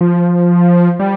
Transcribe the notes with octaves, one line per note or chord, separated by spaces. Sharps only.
F3
G3